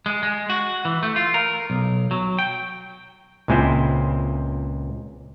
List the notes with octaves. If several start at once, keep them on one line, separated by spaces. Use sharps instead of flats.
G#3
G#3
F#4
E3
A3
F4
A#4
B1
F#3
G5
C#2 A#2 G#3 C4 E4 C5